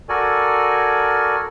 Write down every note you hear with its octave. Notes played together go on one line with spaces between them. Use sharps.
F#4 A4 A#4 D5 G#5